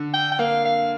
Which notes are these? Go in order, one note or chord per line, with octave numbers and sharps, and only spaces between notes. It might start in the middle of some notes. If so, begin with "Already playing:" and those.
Already playing: D3
G5
G5
A#3 F5
F5